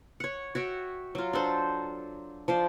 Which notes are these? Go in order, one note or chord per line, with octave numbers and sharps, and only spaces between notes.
C#5 F#5
F#4 C#5 E5 G5
F#3 F4
D4 A4 C5
F3 C5 D5